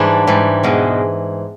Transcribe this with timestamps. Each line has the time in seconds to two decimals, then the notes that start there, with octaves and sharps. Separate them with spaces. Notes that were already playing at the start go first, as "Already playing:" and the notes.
Already playing: G#2 E3 G3 D4
0.27 G#2 E3 G3
0.63 E2 B2 G#3